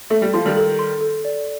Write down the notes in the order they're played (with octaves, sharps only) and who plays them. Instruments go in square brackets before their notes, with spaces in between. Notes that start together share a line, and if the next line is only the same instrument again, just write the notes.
[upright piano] A3 [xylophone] A4
[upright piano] G3
[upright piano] F3 [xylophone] C6
[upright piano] D#3 G3
[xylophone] A4
C6
A4
D5